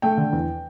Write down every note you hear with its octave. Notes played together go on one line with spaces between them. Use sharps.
A3 G5
D3
E2